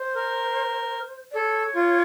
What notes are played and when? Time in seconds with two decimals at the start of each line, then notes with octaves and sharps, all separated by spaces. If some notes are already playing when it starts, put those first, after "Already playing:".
Already playing: C5
0.15 A#4
1.31 D5
1.35 A4 C#5
1.76 F4